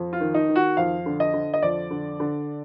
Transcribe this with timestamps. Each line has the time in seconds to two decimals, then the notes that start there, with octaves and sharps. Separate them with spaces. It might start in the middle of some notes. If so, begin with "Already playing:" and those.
Already playing: F2
0.13 F4
0.20 D#3
0.34 D#4
0.49 D#3
0.56 F#4
0.77 F2 F5
1.06 D3
1.20 D#5
1.34 D3
1.54 D#5
1.62 F2 D5
1.91 D3
2.20 D3